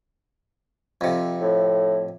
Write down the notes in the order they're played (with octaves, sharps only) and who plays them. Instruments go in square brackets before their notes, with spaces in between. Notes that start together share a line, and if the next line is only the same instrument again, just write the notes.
[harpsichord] F2 C3
[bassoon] A2